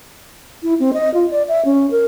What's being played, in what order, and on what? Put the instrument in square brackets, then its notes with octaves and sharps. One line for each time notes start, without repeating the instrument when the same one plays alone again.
[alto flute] E4
C4
D#5
F4
D5
E5
C#4
A#4